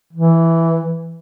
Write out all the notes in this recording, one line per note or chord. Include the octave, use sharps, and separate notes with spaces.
E3